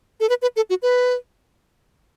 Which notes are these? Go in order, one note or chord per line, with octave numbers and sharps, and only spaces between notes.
A4
B4
B4
A4
F#4
B4